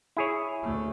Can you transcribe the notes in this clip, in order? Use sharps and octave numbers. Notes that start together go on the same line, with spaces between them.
E4 G#4 C#5
D2 A3